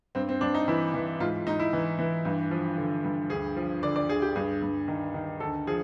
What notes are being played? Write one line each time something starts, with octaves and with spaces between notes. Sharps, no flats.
G2 C4
C4
G2 D4
D#4
E3 E4
E3
G#2 F4
G#2 D#4
E4
E3
E3
G2
F3
D3
G2
D2 G#4
F3
D3 D5
D5
D2 G#4
G4
G2 G#4
G2
D#3
D#3
D2 A4
F3 G#4